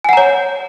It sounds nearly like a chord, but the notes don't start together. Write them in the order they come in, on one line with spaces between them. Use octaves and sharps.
G#5 F#5 A#5 C#5